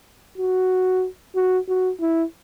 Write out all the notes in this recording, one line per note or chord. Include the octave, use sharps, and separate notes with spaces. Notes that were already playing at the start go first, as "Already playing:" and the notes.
F#4
F#4
F#4
E4